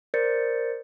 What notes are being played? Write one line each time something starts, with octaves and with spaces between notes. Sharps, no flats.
A#4 C5 D5 G6 A6 C#7